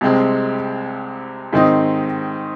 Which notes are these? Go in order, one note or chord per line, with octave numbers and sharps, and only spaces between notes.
C2 C3 G#3 C4
G#2 D#3 C4 D#4